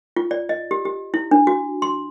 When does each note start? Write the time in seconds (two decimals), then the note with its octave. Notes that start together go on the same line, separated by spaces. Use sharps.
0.16 F4
0.31 D5
0.49 D#5
0.71 G4
0.85 G4
1.14 E4
1.31 D4
1.47 F#4
1.82 C6